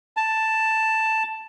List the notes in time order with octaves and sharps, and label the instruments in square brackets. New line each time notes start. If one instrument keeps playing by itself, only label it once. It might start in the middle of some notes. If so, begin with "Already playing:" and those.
[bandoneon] A5